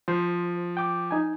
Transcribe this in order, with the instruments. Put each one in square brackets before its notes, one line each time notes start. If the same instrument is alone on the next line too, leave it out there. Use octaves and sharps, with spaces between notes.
[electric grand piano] F3 [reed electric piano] C5
[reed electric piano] G5 D6
D#4 G#5